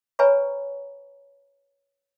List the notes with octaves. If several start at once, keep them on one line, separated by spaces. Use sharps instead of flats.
B4 C#5 G#5 A#5 B5 C#6